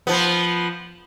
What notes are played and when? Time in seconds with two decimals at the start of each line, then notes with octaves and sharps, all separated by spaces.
0.07 F3 B3